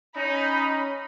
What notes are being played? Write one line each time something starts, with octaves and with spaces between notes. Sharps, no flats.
C#4 D#4 B5